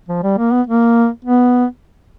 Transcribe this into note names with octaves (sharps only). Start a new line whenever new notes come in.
F3
G3
A#3
B3
A#3
B3